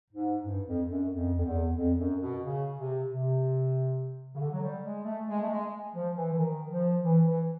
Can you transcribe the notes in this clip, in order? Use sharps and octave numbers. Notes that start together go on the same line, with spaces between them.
G#2
G2
F2
F#2
F2
F2
E2
F2
F#2
B2
C#3
C3
C3
C#3
D3
F#3
G3
G#3
A3
G#3
A3
G#3
F3
E3
E3
D#3
F3
E3
E3